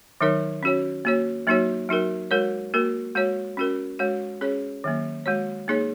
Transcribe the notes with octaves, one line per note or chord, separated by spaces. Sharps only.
D#3 F#3 D#4 A#4 C#5
C#4 F#4 C#5
A#3 F#4 C#5
F#3 A#3 D#4 F#4 C#5
F#3 D#4 F#4 A#4
G#3 F#4 A#4 C#5
A#3 F#4 A#4
G#3 F#4 C#5
C#4 F#4 A#4
G#3 F#4 C#5
C#4 G#4 C#5
D#3 F#3 A#3
G#3 F#4 C#5
A#3 D#4 G#4 C#5